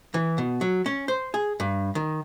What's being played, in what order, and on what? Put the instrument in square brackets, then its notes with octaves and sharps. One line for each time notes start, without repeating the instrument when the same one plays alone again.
[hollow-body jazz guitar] E3
B2
F#3
C#4
C5
G#4
G2
D#3